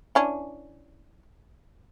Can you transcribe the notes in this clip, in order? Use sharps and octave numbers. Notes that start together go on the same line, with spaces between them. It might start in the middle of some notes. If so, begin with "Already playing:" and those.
E3 C#4 D4